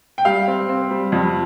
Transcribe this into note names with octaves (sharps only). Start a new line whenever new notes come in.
G5
G3 F5
C4
C4
G3
F2